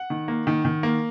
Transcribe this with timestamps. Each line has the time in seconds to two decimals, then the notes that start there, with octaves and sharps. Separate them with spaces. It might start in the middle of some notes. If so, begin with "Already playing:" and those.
Already playing: F#5
0.10 D#3
0.28 A#3
0.47 D#3
0.65 D#3
0.83 A#3